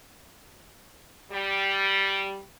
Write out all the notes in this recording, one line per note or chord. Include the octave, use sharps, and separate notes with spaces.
G3